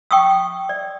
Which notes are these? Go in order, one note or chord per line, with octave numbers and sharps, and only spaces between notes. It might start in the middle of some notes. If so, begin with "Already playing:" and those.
G5 C#6 D#6 E6
D5